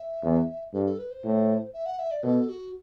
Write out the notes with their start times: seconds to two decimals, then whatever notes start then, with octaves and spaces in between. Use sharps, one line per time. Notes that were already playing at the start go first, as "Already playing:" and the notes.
Already playing: E5
0.23 E2
0.73 G2 A4
0.86 A4
0.99 B4
1.11 C5
1.24 A2
1.73 E5
1.86 F#5
1.99 E5
2.11 D5
2.23 B2 A4
2.49 F#4